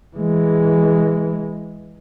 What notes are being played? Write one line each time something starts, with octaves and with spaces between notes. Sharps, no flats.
E3 G#3